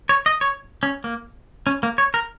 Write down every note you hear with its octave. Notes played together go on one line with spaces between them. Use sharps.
C#5
D#5
C#5
C#4
A#3
C#4
A#3
C#5
A#4